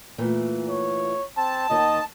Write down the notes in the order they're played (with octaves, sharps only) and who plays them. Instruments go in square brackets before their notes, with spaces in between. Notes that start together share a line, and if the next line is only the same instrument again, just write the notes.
[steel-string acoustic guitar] A#2 E3 A3
[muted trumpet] C#5
[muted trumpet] C4 [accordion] A5
[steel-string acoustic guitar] D#2 D#3 [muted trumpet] D#5